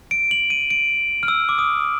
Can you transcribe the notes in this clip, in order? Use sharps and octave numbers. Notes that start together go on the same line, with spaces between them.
D7
F#7
D#7
D7
F6
E6
D6
D#6